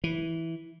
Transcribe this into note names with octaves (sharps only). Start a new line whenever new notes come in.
E3